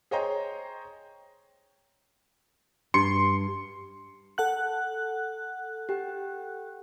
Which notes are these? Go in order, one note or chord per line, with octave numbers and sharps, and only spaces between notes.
G#4 C5 C#5 D#5 G5 A#5
G2 C6 C#7
A4 F#5 F#6
G4 G5